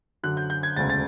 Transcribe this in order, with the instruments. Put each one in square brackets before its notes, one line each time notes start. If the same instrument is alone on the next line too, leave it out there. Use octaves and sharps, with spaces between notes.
[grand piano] F#2 D3 F#3 F#6
G6
G6
G#6
E1 D2 C#3 A6
A6